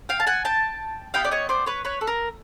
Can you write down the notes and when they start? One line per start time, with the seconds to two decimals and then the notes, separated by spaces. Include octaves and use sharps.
0.09 F5 G5
0.20 A5
0.27 F#5 G#5
0.45 G5 A5
1.14 B3 E4 G4 F5 G5
1.25 D5
1.31 C#5 D#5
1.49 C5 D5
1.66 B4 C#5
1.85 B4 C#5
2.01 A4
2.07 A#4